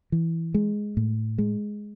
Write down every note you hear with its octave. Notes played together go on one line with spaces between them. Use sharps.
E3
G#3
A2
G#3